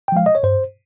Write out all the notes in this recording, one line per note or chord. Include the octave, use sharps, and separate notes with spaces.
G5
F3 G#3 F5
D#5
C#5
G2 C5